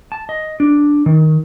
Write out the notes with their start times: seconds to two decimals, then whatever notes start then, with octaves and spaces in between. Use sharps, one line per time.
0.12 A5
0.29 D#5
0.60 D4
1.06 D#3